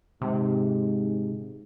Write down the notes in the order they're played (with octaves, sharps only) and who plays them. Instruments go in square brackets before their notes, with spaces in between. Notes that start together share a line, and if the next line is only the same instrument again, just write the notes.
[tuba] G#2 [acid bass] C3